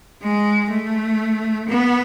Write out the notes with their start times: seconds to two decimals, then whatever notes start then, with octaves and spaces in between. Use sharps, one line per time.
0.22 G#3
0.70 A3
1.68 B3